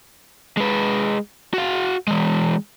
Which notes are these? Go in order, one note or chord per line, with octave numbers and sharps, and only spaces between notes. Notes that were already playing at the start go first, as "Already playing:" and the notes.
G#3 B4
F#4 F5
E3 G#3